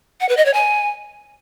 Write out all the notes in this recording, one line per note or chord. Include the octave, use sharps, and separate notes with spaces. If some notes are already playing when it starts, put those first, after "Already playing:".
F#5
B4
D#5
C#5
G#5